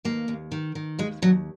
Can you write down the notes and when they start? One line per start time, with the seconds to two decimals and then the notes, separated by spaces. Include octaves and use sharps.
0.05 D#2 A#3
0.28 D#2
0.52 D#3
0.75 D#3
0.99 D#2 G#3
1.22 D#2 F#3